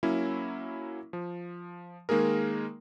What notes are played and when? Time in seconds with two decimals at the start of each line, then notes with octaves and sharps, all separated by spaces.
0.03 F#3 A#3 C#4 E4
1.13 F3
2.09 D#3 G#3 A#3 D#4 G#4 A#4